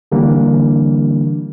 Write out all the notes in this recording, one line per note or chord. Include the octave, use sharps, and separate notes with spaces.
D3 E3 G3 A#3 D4